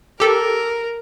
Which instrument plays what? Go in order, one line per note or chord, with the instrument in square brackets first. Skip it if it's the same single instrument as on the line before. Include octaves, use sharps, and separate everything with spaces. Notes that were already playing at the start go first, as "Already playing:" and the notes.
[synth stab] G4 A4 [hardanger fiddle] A#4